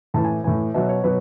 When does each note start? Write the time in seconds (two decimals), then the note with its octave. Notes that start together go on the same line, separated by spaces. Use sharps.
0.14 A2 E3 A5
0.24 G#5
0.44 A2 E3 G#5
0.74 B2 F#3 E5
0.89 C#5
1.04 B2 F#3 B4